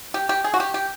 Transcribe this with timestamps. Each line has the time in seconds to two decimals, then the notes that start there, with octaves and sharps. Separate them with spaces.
0.14 G4
0.29 G4
0.44 G#4
0.54 F#4
0.60 G4
0.74 G4